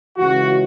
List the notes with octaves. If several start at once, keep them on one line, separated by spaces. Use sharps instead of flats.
C#2 C#3 E3 F#4